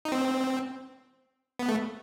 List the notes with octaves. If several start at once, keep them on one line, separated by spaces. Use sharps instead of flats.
D#4
C4
B3
A3